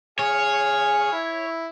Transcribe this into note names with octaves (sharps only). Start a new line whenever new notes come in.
G#4 C#5 F5
E4